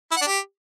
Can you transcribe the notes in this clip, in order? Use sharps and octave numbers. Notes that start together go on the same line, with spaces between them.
E4
F#5
D4
G4